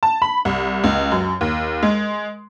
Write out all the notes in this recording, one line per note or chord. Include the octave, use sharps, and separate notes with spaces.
A5
B5
C2
C#2
F#2
D#2
G#3